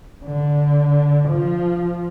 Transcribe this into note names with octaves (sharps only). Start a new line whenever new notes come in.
D3
F3